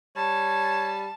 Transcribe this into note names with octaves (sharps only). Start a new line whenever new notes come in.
G3 C#5 A5